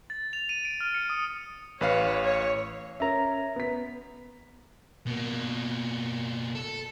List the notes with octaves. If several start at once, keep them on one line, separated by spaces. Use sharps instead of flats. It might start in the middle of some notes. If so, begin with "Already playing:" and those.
A6
F7
D#7
D7
F6
C#7
D#6
A1 B4 C#5 F5
C#5
C#4 A#4 E5 A#5
B3 B6
B2 A#3
A4